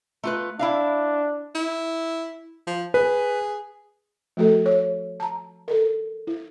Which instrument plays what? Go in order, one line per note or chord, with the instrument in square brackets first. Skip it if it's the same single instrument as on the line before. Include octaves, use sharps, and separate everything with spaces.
[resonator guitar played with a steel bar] A3 F4 B4
[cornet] D4 [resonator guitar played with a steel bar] E4 E5 F5
[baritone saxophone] E4
F3
[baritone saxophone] G#4 [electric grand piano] B4
[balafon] F3 A3 F#4 A4
C#5
A5 A#5
A4 A#4
E4